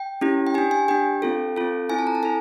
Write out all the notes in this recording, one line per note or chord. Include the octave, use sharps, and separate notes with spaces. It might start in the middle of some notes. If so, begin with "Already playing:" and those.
Already playing: G5
C#4 E4 G4
G5
D4 G4 G#5
G#5
D4 G4 G5
C4 F4 A4
C4 F4 A4
C4 E4 A4 G#5
A5
A#5
A5
E4 A4 G#5